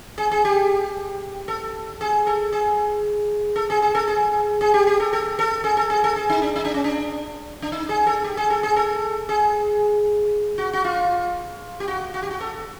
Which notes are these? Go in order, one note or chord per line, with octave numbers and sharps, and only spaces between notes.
G#4
G#4
G4
A4
G#4
A4
G#4
A4
G#4
G#4
A4
G#4
G#4
G4
G4
A4
A4
A4
G#4
A4
G#4
A4
G#4
D#4
D4
D#4
D4
C#4
D4
D4
D#4
G#4
A4
G4
G#4
A4
G#4
A4
G#4
F#4
F#4
F4
G4
F#4
F#4
G4
F#4
A4